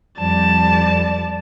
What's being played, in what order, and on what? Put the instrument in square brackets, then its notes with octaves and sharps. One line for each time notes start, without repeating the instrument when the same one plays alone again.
[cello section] F2 G3 D5 [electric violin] A5